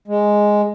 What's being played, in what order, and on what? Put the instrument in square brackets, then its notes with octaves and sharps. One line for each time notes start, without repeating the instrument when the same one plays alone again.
[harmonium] G#3